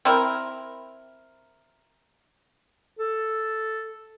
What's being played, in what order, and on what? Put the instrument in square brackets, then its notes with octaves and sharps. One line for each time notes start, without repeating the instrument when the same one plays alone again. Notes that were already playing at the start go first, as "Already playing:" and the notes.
[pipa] C4 E4 A#4
[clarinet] A4